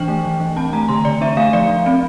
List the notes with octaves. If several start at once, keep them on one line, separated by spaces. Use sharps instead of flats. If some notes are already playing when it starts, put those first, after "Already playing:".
Already playing: E3 D4 G5
A3
E3
E3
C4 A5
A3 A#5
D3 C6
D3 D5
D4 E5
A3 F5
F3 D5
F3
C4